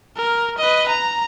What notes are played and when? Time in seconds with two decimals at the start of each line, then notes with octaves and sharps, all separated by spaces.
0.17 A#4
0.58 B4 D#5
0.89 A#5